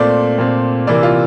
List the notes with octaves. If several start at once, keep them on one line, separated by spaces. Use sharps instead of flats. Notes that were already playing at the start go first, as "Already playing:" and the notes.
Already playing: A#2 A3 C4 D5
A#2 A3 C4
C3 E3 A#3 D5
F4